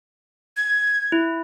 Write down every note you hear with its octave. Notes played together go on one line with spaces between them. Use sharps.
G#6
E4